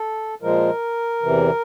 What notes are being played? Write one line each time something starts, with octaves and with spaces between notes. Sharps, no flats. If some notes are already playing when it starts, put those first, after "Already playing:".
Already playing: A4
A#2 F3 G#3 A#4
E2 C3 E3